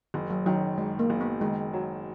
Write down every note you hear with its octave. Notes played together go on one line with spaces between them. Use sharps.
F#1 D#3
F#3
D#3 F#3
F#2 G#3
A#3
F#1
B3
D#3 G#3
F#3